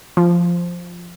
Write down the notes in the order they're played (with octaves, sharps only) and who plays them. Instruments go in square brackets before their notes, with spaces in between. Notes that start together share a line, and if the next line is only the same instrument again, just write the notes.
[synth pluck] F3